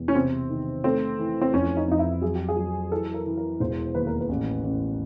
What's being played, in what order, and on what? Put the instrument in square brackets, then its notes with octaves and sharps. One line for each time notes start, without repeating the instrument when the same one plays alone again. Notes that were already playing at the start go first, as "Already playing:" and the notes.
Already playing: [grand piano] E1 E2
[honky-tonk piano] C#4
[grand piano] C3 [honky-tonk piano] C4
[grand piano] D#3
[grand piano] A3 [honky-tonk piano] C4
[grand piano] E3
[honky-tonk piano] C4
[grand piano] F2 [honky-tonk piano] C#4
[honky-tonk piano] D#4
[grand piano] F2 [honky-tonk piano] D#4
[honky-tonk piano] E4
[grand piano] F#3 [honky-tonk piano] G#4
[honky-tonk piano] G4
G#4
[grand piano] F#3
[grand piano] E3 [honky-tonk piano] A4
[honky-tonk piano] A#4
[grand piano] E3
[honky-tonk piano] A#4
[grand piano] E1 [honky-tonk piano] C5
[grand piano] D#2 [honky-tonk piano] B4
[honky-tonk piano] A#4
B4
[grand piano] A1
A1